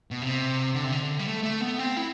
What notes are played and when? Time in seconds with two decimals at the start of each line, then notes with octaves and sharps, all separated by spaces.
0.11 B2
0.22 C3
0.74 D3
0.84 C3
0.92 D3
1.19 G3
1.26 A3
1.43 A3
1.61 B3
1.78 C4
1.97 E4